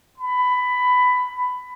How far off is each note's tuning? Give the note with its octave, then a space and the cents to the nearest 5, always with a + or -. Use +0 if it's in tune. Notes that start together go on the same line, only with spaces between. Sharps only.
B5 +15